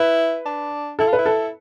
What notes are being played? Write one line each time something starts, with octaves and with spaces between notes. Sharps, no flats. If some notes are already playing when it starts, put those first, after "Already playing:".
Already playing: E4 B4
D4
E4 A4
F4
B4
E4
A4